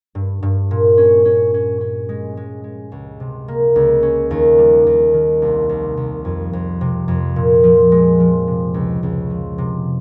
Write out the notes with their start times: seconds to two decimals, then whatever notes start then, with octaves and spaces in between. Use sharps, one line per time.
0.15 G2
0.43 G2
0.71 A#2
0.97 C#4
1.25 C#4
1.54 C#4
1.81 C#4
2.09 G#3
2.37 G#3
2.64 G#3
2.92 C#2
3.20 C3
3.48 A#3
3.76 C#2
4.03 C#4
4.31 D#2
4.58 G3
4.87 D#2
5.14 D#3
5.42 C2
5.69 C2
5.97 C2
6.25 F2
6.53 F2
6.81 C3
7.08 F2
7.36 A#2
7.64 F3
7.92 G#3
8.20 F3
8.47 C3
8.74 C#2
9.03 C#2
9.30 F3
9.58 C3